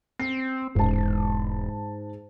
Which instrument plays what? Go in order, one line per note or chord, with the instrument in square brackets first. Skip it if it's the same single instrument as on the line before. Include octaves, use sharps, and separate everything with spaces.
[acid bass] C4 [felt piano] C7
[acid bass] E1 [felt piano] G#2 A5